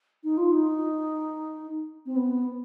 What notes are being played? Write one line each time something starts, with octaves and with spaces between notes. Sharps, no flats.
D#4
F4
D#4
C4
B3